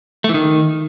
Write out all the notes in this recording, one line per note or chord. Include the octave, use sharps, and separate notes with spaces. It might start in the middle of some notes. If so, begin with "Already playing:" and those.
A3
E3
D#3